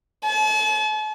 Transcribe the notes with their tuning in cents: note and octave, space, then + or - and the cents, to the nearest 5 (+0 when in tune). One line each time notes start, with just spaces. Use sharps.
A5 -45